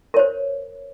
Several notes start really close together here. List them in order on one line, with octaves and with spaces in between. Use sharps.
A#4 C#5 C5